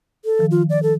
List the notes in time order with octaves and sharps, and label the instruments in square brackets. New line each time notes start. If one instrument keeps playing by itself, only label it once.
[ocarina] A4
[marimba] D#3 F3
[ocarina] F4
D5
A4